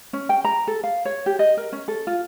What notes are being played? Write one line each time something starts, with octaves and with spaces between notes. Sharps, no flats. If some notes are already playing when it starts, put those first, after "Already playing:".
C#4
G5
A#5
A4
F5
C#5
G4
D#5
A#4
C#4
A4
F4